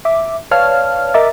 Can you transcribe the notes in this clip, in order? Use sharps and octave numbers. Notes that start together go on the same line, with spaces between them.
E5 D6
B4 C#5 D5 F5 A5 F6
A#4 D#5 E5 A#5 D6 A6